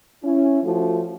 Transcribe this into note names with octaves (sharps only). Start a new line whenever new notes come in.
C#4 E4
F3 A3 F4 F#4